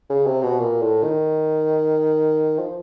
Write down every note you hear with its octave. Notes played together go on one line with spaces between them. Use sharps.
C#3
C3
B2
A#2
A2
D#3
F3